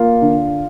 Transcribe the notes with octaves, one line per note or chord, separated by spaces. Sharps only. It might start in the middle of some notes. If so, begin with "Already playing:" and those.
Already playing: A#3 F4
D3